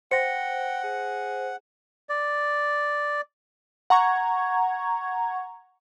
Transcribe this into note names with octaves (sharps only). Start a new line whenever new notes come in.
C5 F#5 G5 A#6 C#7
G#4
D5
F#5 A#5 C#6 G#6